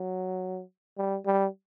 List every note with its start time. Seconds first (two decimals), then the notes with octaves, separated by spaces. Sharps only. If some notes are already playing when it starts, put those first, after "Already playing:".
Already playing: F#3
0.98 G3
1.26 G3